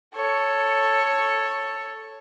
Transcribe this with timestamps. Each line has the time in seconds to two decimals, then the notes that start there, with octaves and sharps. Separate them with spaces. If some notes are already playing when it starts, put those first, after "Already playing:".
0.15 A4 C#5